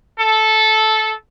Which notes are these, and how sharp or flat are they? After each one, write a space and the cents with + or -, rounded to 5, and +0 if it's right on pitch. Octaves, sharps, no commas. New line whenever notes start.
A4 -10